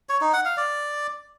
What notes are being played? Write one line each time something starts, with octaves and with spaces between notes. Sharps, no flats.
C#5
D#4
F#5
F5
D5